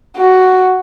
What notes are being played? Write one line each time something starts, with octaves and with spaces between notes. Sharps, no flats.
F#4